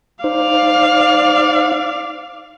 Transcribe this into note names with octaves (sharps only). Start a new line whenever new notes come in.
D#4 C5 D5 F5